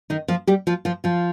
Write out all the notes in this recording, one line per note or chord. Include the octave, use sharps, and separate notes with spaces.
D#3 D#4
F3 F4
G3 G4
F3 F4
F3 F4
F3 F4